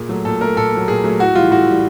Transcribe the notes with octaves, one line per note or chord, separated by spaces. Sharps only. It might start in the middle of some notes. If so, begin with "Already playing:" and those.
Already playing: A#2 G#4
F#3 A3
A#2 A4
F#3 A3 A#4
A#2 A4
F#3 A3
A#2 G#4
F#3 A3
A2 F#4
E3 G3 F4
A2 F#4
E3 G3